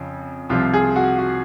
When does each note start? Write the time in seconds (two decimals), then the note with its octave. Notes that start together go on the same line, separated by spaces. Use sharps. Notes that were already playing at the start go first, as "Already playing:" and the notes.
Already playing: F2 C#3
0.49 C2 C3 F3 F4
0.73 G#4
0.96 F#4
1.18 F#4